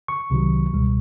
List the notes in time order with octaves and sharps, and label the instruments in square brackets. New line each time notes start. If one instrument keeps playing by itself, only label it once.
[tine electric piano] C#6
C2 C3 D#3 F#3
C#2 B2 G3